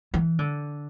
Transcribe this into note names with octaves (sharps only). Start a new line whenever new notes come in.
E3
D3